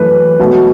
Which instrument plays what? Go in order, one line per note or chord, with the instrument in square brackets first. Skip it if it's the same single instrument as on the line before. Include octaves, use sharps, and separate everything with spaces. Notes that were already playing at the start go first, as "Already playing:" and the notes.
Already playing: [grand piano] F#2 E3 A3 B4
B1 B2 A3